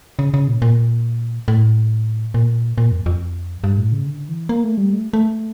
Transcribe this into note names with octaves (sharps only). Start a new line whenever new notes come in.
C#3
C#3
A#2
A#2
A2
A#2
A#2
F2
F2
G2
A2
C#3
D3
E3
A#3
A3
G3
A3
A3